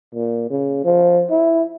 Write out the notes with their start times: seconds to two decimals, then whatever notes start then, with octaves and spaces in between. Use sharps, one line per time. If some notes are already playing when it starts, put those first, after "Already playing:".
0.15 A#2
0.50 C#3
0.85 F3
1.31 E4